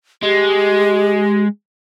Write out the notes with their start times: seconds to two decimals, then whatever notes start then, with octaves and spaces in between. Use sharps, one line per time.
0.23 G#3 G4